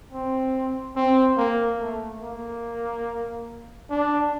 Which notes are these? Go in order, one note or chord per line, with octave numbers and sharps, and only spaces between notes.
C4
C4
A#3
A3
A#3
D4